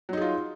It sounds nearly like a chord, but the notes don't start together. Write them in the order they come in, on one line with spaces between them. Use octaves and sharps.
F#3 D#4 G#4 F4